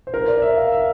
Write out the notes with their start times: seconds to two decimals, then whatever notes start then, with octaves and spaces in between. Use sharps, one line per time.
0.07 C5
0.14 A#4
0.28 D5
0.42 E5
0.57 F5
0.72 E5